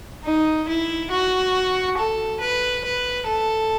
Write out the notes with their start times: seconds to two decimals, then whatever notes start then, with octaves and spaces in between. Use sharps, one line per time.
0.25 D#4
0.68 E4
1.11 F#4
1.98 A4
2.40 B4
2.85 B4
3.27 A4